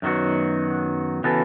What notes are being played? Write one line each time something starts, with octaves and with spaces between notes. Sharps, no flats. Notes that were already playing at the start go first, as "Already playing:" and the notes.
F#2 D#3 F#3 B3 F#4
C#3 E3 B3 F#4 A4